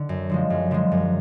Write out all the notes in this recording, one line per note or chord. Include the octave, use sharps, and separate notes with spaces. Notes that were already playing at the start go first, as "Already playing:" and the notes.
Already playing: D3
F#2
D3 F3 G#3
F#2
D3 F3 G#3
F#2